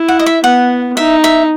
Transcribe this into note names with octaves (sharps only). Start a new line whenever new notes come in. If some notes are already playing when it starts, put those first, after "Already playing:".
Already playing: E4
F#5
D#5
E5
B3 F#5
D#4 E5
E5